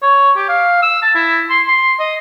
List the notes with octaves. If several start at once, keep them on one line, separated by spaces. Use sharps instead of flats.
C#5
G4
F5
E6
A5
E4
C6
C6
D#5